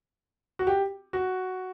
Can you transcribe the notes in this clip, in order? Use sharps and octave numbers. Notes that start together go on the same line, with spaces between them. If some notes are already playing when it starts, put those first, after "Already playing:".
F#4
G4
F#4